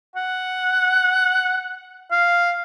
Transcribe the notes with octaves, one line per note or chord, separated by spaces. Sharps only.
F#5
F5